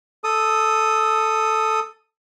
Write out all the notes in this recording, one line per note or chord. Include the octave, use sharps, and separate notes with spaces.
A4 D#6